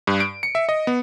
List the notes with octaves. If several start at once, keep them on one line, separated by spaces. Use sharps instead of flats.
G2
D7
C#7
E5
D#5
B3